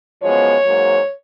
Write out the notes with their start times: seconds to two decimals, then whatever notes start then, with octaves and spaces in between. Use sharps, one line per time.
0.21 F#2 F3 G#3 B3 C#5
0.64 G#2 F#3 A#3